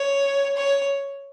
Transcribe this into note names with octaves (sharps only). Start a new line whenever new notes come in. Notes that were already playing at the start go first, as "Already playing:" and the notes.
Already playing: C#5
C#5